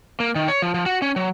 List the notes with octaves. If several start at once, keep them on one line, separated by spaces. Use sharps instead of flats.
A#3
D#3
C#5
F3
F3
F#4
C#4
F#3